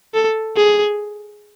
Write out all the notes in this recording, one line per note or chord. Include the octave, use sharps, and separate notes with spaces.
A4
G#4